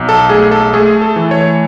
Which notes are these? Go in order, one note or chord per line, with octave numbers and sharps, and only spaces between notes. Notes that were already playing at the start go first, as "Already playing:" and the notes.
Already playing: B1
A4
A3 G#4
A4
A3 G#4
A4
E3
C#5